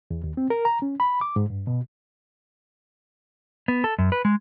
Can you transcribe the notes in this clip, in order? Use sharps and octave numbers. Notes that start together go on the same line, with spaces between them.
E2
D#2
C4
A#4
A#5
C#4
B5
D6
G#2
G2
B2
B3
A4
F#2
B4
G#3